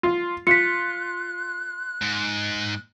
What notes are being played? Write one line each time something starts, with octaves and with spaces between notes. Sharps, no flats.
F4
F4 F#6 B6 C#7
G#2